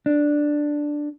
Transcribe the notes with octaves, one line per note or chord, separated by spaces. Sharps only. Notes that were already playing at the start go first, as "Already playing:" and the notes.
D4